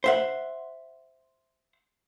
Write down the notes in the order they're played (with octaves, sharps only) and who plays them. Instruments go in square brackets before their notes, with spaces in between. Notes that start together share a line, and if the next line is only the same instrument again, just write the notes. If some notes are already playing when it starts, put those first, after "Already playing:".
[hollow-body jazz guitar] C5 E5 F#5